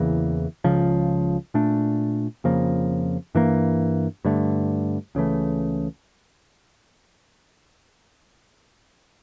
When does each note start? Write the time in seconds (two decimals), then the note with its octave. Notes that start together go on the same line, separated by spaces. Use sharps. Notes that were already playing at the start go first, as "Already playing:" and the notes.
Already playing: E2 C#3 E3 A#3
0.64 C#2 C#3 F3
1.54 A#2 A3 D4
2.44 F2 C#3 F3 A#3
3.35 G2 E3 A#3
4.25 G2 D3 A3
5.15 C#2 C#3 E3 A3